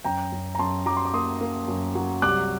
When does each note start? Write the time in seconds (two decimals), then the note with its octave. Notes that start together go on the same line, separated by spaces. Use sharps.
0.04 F#2 G5 A#5
0.32 F#2
0.55 A#5
0.59 F#2 A5 C6
0.86 F#3 A#5 D6
0.97 C6
1.05 D6
1.14 A#3 C6 D#6
1.41 A#3
1.68 F#2
1.95 F#3
2.22 C2 D6 F#6